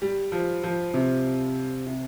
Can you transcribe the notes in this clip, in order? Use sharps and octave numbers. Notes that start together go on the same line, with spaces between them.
G3
F3
F3
C3
C3